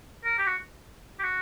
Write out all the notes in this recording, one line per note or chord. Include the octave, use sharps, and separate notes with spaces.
A#4
G4
F#4
G4
F#4